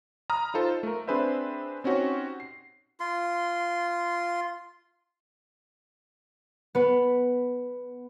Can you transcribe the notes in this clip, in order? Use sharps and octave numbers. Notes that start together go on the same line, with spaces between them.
A#5 B5 D#6 F6
D#4 F4 A4 C5
A3 A#4
C4 D4 G#4 B4 C5 E5
C4 C#4 D#4 F#4 G4 C#5
C7
F4 C6
B3 B4